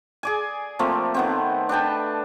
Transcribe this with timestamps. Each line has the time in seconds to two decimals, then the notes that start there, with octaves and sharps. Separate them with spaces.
0.23 G#4 D5 G#5
0.79 F3 A3 A#3 C4
1.14 D#3 B3 C4
1.69 D4 B4 G5 A5